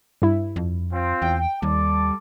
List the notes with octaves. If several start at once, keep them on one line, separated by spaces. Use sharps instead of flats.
G2 E4
F2
C4 F4
E2 G5
D#2 G3 A4 A5 D6